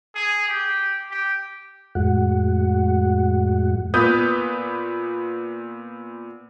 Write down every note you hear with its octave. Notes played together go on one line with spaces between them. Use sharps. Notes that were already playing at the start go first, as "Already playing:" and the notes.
G#4
G4
G4
F2 A2 G#3 F#4 F#5
A#2 B3 B4 D#6 G6